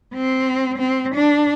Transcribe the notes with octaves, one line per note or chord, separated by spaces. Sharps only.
C4
C4
D4